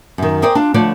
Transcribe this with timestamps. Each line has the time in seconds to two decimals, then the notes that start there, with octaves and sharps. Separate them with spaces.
0.18 F#2 D#3
0.42 G#4 A#4 C5 D5 G5
0.55 D4 F4
0.74 D3 F3 A3 B4 C#5 D5